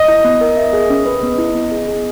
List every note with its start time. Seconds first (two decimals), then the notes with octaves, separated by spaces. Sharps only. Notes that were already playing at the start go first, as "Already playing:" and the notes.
Already playing: D#5
0.08 E4
0.25 B3
0.41 A#4
0.57 E5
0.73 G#4
0.90 C#4
1.06 B4
1.23 B3
1.38 E4
1.55 B3
1.71 G#4
1.88 G#4